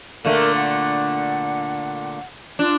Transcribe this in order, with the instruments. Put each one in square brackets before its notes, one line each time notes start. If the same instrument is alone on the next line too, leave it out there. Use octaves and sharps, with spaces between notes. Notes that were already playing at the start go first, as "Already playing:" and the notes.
[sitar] A#2 D3 A3 [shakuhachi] A#4
[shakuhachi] F#5
[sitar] D4 [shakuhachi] F4